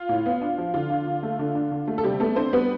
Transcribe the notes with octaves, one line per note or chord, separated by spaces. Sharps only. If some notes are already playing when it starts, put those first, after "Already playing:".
Already playing: F4
A2
B3
D4
F3
D3 F4
D4
D3
A3
D3
D4
D3
A3
A4
C3 G3 G4
A3 B3 A4
C4 D4 C5
G3 B3 B4